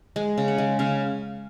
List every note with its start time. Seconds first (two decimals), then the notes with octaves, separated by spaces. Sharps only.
0.16 G#3 G#4
0.38 C#3
0.48 F#5
0.58 G#3
0.79 C#3 F5